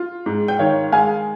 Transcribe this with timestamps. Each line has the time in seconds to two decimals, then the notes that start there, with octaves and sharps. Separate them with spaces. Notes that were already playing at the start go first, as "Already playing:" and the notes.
Already playing: F4
0.26 G#2
0.48 G5
0.59 D#3 C#5 F5
0.92 G#3 F5 G#5